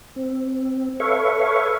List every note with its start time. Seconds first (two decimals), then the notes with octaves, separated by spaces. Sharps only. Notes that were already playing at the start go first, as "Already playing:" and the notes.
0.16 C4
1.00 A4 B4 C#5 E5 F5 C#6